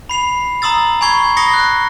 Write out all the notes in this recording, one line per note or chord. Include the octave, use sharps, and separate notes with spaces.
B5 C7 F7
A#5 C6 D#6 E6 A6
G#5 B5 C#6 G#6 C7 G7
B5 D#6 A#6 C7 C#7 G7
F#6